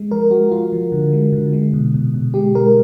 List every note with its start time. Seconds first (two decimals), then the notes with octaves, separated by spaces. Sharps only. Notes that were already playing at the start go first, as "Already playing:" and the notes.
Already playing: G#3
0.11 F3 A#4
0.31 G#3 F#4
0.52 F3 F4
0.73 F3
0.92 D3
1.13 G#3
1.33 D3
1.53 G#3
1.74 B2
1.94 B2
2.14 B2
2.34 G#3 G4
2.55 G#3 A#4